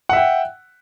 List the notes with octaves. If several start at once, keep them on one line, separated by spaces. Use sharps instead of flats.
E5 F#5 G5